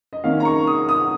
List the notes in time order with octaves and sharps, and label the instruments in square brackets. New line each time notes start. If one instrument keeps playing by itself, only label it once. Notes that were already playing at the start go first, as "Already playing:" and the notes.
[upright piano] D#5
D#3 A#3 C#4 F5
A#5
C#6
D#6
D#6